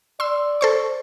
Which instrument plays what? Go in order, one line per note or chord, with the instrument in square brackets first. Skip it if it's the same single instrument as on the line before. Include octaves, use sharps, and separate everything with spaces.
[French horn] D5 [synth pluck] C6 E6
[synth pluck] A4 C5 C#6